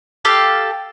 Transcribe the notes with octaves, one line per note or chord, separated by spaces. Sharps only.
G4 A4 F5 A5